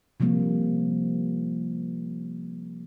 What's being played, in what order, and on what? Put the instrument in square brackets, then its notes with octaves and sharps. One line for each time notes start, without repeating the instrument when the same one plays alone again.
[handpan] C3 F3 G3 A#3 C4